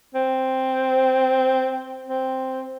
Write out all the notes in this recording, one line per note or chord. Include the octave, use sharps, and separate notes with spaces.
C4
C4